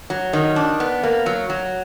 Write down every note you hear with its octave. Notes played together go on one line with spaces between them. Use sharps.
F#3
D#3
D4
B3
A#3
F#3
F#3